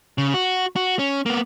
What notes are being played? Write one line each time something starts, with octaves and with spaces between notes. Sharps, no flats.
C#3
F#4
F#4
C#4
A#3 B3